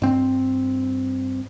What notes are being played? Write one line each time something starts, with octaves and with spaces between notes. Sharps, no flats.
G2 C4